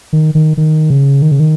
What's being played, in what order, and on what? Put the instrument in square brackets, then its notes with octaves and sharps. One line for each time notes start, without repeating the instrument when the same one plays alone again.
[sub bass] D#3
D#3
D#3
C#3
D#3
C#3
D#3